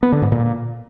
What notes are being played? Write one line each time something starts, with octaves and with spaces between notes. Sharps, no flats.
B3
D3
G#2
A#2